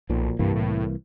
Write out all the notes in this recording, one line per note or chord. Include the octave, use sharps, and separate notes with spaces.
B1 A#2 F3
C2 G2 E3 A#3
A2